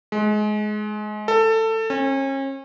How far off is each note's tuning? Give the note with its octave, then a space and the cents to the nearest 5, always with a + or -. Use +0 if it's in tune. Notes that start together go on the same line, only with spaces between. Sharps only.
G#3 +25
A4 +20
C#4 -35